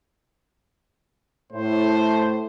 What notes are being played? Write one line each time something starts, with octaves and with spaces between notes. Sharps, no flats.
A2 C5